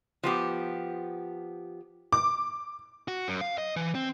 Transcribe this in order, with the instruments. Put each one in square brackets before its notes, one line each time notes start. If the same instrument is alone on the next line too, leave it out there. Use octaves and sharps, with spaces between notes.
[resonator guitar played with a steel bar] F3 B3 G4
[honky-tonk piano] D6
[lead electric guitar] F#4
F#2
F5
D#5
E3
C4